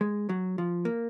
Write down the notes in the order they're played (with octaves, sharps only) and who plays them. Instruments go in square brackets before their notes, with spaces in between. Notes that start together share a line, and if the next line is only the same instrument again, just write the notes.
[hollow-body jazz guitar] G#3
F#3
F3
A#3